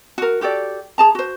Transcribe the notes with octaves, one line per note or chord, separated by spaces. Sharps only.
F#4 A#4
F#4 G4 A4 D5
G#4 A5 A#5
F#4 C5